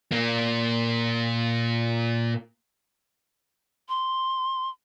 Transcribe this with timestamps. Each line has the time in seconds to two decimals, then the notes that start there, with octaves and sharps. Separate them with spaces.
0.12 A#2 A#3
3.89 C6